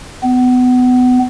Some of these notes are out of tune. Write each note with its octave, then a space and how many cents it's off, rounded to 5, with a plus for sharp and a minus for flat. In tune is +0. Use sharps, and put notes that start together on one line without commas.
B3 +25